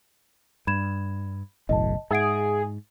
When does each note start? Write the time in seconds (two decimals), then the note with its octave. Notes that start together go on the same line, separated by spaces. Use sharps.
0.67 G2 B5 G#6 E7
1.69 F#1 B1 A2 D#5 A5
2.11 G#2 G#4 E5 F#5 D7